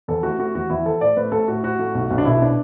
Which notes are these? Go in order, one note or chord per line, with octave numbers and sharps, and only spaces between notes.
E2 A4
A3 F#4
A3 F#4
E2 F#4
E2 E4
E3 A4
A2 D5
A3 B4
A3 A4
A2 F#4
A2 F#4
A3
B1
B1
D4
B2 E4
D4